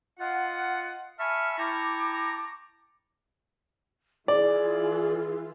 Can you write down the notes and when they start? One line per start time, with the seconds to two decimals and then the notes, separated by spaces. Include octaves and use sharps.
0.19 F4 D#5 F5 F#5
1.19 E5 G#5 A5 B5 C#6 F6
1.58 E4 G5 A5 A#5 C#6 D6
4.28 E3 F4 G#4 D5